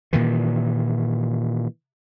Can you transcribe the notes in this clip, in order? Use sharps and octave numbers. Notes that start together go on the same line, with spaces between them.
A#2 D#3 E3